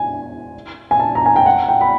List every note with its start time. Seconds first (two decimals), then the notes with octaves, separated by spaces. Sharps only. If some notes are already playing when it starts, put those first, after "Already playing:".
Already playing: G#5
0.91 G#5
1.00 A5
1.15 A#5
1.26 G#5
1.36 G5
1.46 F#5
1.69 G5
1.81 B5